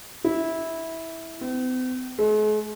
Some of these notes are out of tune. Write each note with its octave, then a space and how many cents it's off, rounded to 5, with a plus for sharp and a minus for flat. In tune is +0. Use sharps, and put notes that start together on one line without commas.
E4 -15
C4 -45
G#3 +45